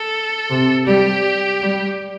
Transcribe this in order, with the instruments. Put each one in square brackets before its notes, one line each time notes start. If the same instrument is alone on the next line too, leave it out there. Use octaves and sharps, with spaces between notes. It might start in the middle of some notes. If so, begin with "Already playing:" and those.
Already playing: [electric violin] A4
[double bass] C3
[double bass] G3 [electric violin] G4
[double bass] G3